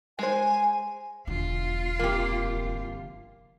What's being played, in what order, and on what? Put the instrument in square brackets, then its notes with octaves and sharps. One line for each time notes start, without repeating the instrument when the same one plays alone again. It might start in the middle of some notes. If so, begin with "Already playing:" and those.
[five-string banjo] G#3 C5 [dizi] G#5
[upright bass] E1 D3 [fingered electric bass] E2 [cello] F4
[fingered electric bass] G1 C3 F3 [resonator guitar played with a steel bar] A#3 G4